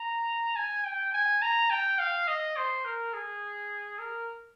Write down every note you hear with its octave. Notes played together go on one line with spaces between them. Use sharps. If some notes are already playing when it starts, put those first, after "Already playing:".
Already playing: A#5
G#5
G5
G#5
A#5
G5
F5
D#5
C5
A#4
G#4
A#4